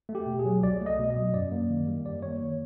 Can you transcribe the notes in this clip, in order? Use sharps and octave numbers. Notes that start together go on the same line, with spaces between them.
A3
G4
B2
G#4
F#3
C2 D5
A3
D#5
B2
D#5
F#3
F#2 D5
A#3
D#3
G3
F#2 D5
A#3 C#5
D#3